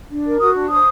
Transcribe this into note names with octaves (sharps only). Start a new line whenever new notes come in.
D4
A#4
F#4 D#6
D4
C5 D#6